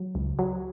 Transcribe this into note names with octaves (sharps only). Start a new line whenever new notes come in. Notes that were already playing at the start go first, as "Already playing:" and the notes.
Already playing: F#3
C#2
F#3